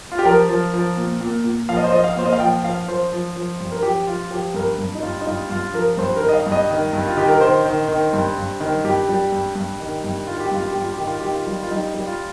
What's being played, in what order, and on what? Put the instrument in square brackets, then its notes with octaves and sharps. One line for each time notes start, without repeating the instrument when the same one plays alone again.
[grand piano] F4
G4
F3 A#4
F3
F3
A#2
A#2
A#2
F3 F5
D#5
C5
F3 D#5
F5
A#2 C5
D#5
F5
F3 G5
F3 F5
F3 C5
F3
F3
G2
A#4
F3 G4
F3 F4
F3 G4
G2 A#4
G2
D#4
G2 F4
D#4
G2 F4
G2 F4
F3 A#4
G2 C5
A#4
D#3
D#5
F5
G2
D#5
D#3
G2
F4
D#3 G4
A#4
D#3 C5
D#3
D#3
G2
G2
D#3
G2 G4
G3
G2
G2
D#3
G2
D#3 F4
G4
G2 F4
G4
G2
F4
D#3 G4
F4
D#3 G4
F4
G3
F4
G3 D#4
G3
F4